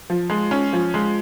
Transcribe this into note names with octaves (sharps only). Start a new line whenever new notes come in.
F3
G#3
C#4
F3
G#3